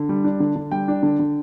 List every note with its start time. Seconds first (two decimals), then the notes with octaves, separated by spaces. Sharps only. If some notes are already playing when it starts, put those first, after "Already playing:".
Already playing: D3
0.09 G3
0.24 D4
0.40 D3
0.56 D3
0.71 G3 G5
0.88 D4
1.03 D3
1.19 D3